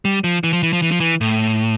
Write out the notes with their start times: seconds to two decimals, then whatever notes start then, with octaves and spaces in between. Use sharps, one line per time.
0.05 G3
0.24 F3
0.44 E3
0.53 F3
0.63 E3
0.73 F3
0.82 E3
0.91 F3
1.00 E3
1.21 A2